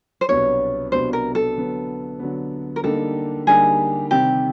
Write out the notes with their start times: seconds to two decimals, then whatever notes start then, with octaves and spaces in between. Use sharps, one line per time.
0.21 C5
0.28 C2 B2 F#3 B3 D4 C#5
0.92 C2 B2 F#3 B3 D4 C5
1.13 A#4
1.35 A4
1.56 D3 F#3 B3
2.19 D3 F#3 B3
2.76 A#4
2.84 D3 G3 A#3 D#4 G4 A4
3.47 D3 G3 A#3 D#4 G4 G#4
4.11 C3 D#3 G3 C4 G4